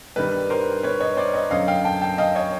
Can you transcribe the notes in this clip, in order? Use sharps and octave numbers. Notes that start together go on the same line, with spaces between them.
G2 D#3 G3 B4
A#4 C5
B4 C#5
C#5 D#5
C5 D5
C#5 D#5
F#2 D3 F#3 D#5 F5
F5 G5
G5 A5
G5 A5
D#5 F5
C#5 D#5